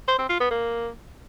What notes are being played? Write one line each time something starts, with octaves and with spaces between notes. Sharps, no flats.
C5
C4
F4
B3
A#3